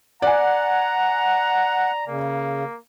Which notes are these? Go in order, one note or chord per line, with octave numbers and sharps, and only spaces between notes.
D5 F#5 G#5 A#5
C#3 A#3